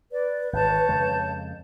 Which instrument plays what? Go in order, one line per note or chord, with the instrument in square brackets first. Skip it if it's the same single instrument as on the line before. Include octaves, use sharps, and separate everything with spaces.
[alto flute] B4 [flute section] D5
[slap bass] G#1 [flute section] C#5 A5 G6
[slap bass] F2 C#3 G#3